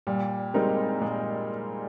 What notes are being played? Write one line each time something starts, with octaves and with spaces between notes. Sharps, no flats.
A#2 G3
G3 G#3 C4 D#4 A#4
A#2 G#3